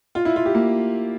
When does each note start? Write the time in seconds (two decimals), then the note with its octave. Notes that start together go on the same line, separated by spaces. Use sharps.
0.15 F4
0.25 E4
0.36 F4
0.46 G4
0.55 A#3